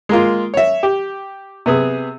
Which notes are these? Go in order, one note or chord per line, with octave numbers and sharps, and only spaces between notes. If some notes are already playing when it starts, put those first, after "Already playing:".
G#3 A#3 F4
C#5 E5
G4
C3 B3 G#4